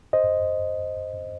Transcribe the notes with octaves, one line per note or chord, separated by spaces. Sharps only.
C5 D#5